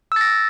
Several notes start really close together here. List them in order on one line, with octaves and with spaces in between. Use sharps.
E6 A6 A#6